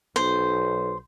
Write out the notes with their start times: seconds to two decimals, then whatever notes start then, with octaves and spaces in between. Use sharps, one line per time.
0.16 B1 C5